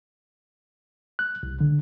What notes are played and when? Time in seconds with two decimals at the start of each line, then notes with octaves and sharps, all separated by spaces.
1.19 F#6
1.43 C2
1.61 D3